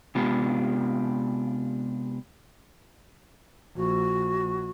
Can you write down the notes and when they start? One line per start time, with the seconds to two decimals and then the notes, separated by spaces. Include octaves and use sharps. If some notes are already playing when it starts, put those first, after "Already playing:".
0.15 C3 G#3 B3 D4 F4 G4
3.76 A#1 F#4